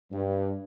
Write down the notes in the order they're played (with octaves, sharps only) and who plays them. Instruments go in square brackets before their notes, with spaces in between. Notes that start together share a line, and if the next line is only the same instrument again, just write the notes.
[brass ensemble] G2